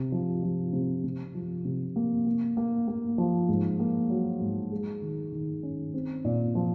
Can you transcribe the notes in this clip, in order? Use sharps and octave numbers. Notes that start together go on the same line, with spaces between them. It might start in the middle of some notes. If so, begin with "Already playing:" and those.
Already playing: C3
F3
F3
C3
C3
F3
C3
A#3
A#3
A#3
A#3
F3
G#2
A#3
F#3
G#2
G#3
D#3
D#3
C#4
C4
A#2
F3